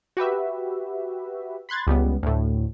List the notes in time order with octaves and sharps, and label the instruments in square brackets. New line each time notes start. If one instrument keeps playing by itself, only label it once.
[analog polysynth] F#4 G4 B4 E5
B5 C6 F#6 G#6 A6
C#2 G3 B3
D2 A2